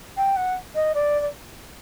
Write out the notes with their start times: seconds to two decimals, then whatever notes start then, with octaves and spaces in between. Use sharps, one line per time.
0.16 G5
0.36 F#5
0.74 D#5
0.94 D5
1.20 D5